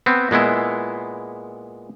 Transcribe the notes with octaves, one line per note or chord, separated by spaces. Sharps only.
B3 C4
A#2 G#3 B3 E4